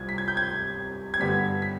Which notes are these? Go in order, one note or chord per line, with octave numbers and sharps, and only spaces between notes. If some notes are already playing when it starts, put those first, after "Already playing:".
Already playing: C2 C3 G3 C4 F4 G#6
B6
G#6
G6
G#6
G#6
G2 D3 G3 B3 B6
B6